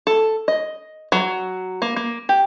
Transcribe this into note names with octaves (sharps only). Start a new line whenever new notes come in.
A4
D#5
F#3
A#3
A#3
G4